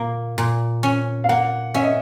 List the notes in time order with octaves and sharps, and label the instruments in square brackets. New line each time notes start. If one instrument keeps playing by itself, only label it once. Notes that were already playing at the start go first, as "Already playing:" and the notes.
Already playing: [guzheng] A#2 A#3
A#2
C#4
[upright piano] F5
[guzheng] A#3 [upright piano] F#5
[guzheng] C#4 [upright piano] E5
[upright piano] D#5